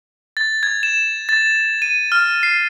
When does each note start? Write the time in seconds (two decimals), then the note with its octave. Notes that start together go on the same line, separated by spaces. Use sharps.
0.37 A6
0.63 G#6
0.83 E7
1.29 A6
1.82 D#7
2.12 F6
2.43 C7